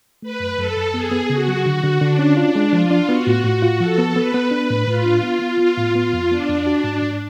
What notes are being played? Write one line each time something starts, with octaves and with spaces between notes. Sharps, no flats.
A3 B4
F#2
F#2 A4
F#2
B3 G#4
B3
C#3 F#4
F#3
D3
D3
D3 D4
C#4
D4 F4
G#3
F3 F4
D4
B3 F#4
A2
A2
F4
F3 A4
B3
B3 B4
B3
D4 B4
A2
A2 F4
D4
B3
B3
B3 F4
A2
B3 F4
F2
B3 D4
F2
F#4
G#2
G#2